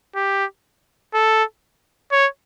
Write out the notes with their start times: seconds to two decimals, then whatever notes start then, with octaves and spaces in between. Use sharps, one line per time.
0.15 G4
1.14 A4
2.12 C#5